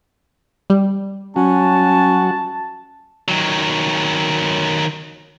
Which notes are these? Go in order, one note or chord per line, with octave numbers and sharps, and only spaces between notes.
G3
F#3 C#4 F#4 A5
D#3 F#3